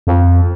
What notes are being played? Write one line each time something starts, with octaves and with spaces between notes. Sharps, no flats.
F2